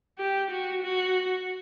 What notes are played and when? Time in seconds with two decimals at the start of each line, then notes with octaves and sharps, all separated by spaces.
0.18 G4
0.50 F#4
0.83 F#4